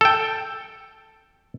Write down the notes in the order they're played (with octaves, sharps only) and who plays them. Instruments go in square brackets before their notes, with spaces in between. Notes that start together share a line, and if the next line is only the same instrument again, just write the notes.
[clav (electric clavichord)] A4 G5